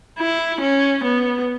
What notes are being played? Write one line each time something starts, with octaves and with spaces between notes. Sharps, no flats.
E4
C#4
B3